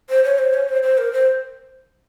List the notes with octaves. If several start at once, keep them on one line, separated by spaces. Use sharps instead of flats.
C5
C#5
C5
C#5
C5
C5
A#4
C5